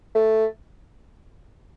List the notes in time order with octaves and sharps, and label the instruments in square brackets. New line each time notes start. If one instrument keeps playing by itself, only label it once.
[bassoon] A3